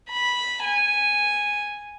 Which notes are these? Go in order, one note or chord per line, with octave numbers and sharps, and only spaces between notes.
B5
G#5